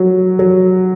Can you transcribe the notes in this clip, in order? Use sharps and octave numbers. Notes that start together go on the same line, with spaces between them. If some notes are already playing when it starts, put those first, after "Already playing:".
Already playing: F#3
F#3